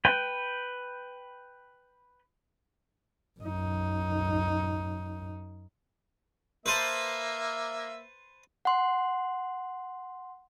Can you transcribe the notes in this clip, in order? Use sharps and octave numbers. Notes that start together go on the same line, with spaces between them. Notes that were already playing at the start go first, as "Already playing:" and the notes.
B4 G5
F#2 D#4
A#3 B4 C5 E5 A5
F#5 C6